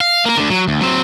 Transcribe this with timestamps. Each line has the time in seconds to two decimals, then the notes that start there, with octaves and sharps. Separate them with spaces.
0.01 F5
0.26 A#3 A#4
0.37 D2 D3
0.50 F#3
0.68 D2
0.81 F#3 C4